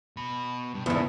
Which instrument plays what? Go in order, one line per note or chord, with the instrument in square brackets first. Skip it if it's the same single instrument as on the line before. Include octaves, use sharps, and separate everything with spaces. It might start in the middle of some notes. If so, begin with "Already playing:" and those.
[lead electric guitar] B2 B5
G2
[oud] E2 G#2 [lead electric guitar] C#3 D4